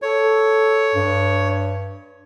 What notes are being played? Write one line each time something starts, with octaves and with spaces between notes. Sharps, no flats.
A4 C#5
G2